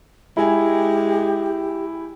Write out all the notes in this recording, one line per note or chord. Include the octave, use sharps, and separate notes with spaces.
G#3 E4 G4 G#5